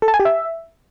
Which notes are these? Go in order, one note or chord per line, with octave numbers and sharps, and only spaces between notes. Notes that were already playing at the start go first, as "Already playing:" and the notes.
A4
A5
G#5
G4
E5